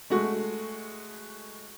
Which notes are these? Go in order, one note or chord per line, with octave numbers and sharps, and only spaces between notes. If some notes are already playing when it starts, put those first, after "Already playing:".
G#3 A3 F#4